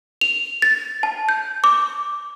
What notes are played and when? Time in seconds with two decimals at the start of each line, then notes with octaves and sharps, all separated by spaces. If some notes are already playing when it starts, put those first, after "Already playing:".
0.21 F7
0.62 A6
1.03 A5
1.29 G6
1.64 D6